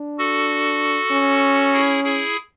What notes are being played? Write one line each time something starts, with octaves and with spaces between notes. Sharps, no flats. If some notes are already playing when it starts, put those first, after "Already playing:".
Already playing: D4
F#4 A4
C#4
E4 G#4
E4 G#4